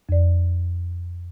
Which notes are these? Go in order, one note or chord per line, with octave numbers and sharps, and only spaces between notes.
F2 D5